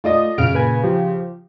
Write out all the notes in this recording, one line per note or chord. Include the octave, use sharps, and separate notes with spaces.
A3 F4 D5 D#5 D#6
F#2 C#3 F6 D7
A#2 B4 G#5
F3 G4